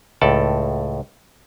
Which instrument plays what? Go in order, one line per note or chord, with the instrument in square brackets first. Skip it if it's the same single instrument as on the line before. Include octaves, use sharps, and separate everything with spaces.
[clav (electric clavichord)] C#2 A2 A4 D5 A5